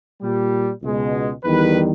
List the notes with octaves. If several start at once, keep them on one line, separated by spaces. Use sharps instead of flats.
A#2 G3
C#2 B2 G#3
E2 D#3 G3 B4